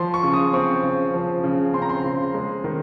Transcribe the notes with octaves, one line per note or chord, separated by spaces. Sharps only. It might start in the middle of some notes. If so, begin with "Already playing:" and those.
Already playing: F3 C6
C#6
C#3
D#6
C4 C#6
C#3
F3
C#3
C4 C6
A#5
C6
C#3
G#3
D#3